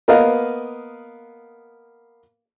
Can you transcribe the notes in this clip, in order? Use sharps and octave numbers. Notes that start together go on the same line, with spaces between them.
A#3 B3 A#4 B4 D#5 F5